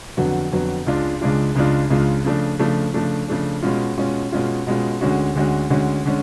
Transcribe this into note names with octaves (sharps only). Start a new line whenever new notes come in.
F2 D3 F#3 B3 F#4
F2 D3 F#3 B3 F#4
C#2 C#3 G#3 D4 F4
C#2 C#3 G#3 D4 F4
C#2 C#3 G#3 D4 F4
C#2 C#3 G#3 D4 F4
C#3 F3 A3 D4
C#3 F3 A3 D4
C#3 F3 A3 D4
C#3 F3 A3 D4
B2 G#3 C#4 F4
B2 G#3 C#4 F4
B2 G#3 C#4 F4
B2 G#3 C#4 F4
D2 D3 G#3 C#4 F#4
D2 D3 G#3 C#4 F#4
D2 D3 G#3 C#4 F#4
D3 G#3 C#4